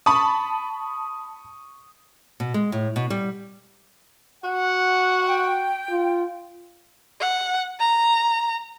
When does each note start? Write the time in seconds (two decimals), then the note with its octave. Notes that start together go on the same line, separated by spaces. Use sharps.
0.06 A5 B5 C#6 D#6
2.40 B2
2.54 G#3
2.72 A2
2.96 B2
3.10 G3
4.44 F#4 F#5
5.27 G5
5.90 F4
7.20 F#5
7.80 A#5